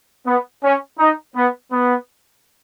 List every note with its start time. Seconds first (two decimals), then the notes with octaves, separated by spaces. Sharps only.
0.26 B3
0.63 C#4
0.98 D#4
1.35 B3
1.71 B3